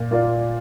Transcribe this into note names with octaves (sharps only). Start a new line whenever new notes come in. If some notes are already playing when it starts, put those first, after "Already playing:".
Already playing: A#2
A#3 F4 D5